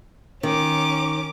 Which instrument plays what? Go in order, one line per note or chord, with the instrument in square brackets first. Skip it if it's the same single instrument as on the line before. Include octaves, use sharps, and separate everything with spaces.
[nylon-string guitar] D#3 [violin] C#4 D6